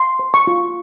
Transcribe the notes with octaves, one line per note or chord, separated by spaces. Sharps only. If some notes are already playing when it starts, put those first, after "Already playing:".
Already playing: C6
C5
C#6
F4